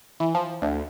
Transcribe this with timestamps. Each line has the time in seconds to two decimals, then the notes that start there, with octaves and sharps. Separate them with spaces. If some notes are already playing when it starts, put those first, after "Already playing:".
0.20 E3
0.34 F3
0.62 D2